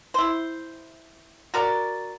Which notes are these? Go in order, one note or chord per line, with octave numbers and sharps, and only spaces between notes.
E4 C5
F#4 A#4 D5